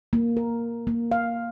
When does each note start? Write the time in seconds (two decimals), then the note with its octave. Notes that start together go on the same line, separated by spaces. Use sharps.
0.13 A#3
0.37 A#4
0.87 A#3
1.12 F5